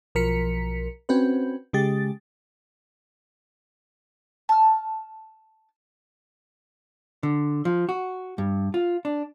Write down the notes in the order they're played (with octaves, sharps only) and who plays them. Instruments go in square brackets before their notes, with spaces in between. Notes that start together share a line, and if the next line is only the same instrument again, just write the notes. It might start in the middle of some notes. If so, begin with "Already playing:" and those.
[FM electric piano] B1 F3 A#4 B6 C#7
C4 C#4 F#4 B4
C#3 G#3 G4 A6
[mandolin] A5 F6
[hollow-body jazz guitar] D3
F3
F#4
G2
F4
D4